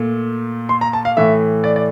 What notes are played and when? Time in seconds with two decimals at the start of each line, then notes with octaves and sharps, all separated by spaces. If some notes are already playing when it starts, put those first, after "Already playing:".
Already playing: A#2 A3
0.69 C6
0.81 A#5
0.93 A5
1.05 F5
1.17 A2 E3 A3 E5
1.64 D5
1.76 D5